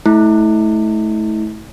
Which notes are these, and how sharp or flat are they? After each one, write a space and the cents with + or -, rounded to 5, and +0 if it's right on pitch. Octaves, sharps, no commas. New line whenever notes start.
A3 -25 E4 -30